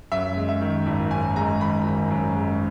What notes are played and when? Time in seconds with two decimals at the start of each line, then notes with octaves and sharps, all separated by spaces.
0.12 F#2 E5
0.36 G#3
0.49 E5
0.61 D#3
0.86 G#1
1.11 F#2 G#5
1.36 G#3 A#5
1.61 D#3 B5
1.86 G#1
2.11 F#2
2.36 G#3